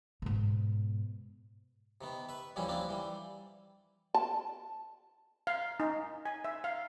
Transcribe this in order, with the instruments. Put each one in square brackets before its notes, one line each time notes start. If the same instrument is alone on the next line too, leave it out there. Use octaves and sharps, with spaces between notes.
[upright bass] G#2 B2
[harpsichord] C3 D#3 B3
B4 E5
D#2 E3 F3 G3 C#4 E4
F3 A#3 C4 D4 E4
E3 G3
[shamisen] A5
[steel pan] F5
D#4
G#5
E5
F5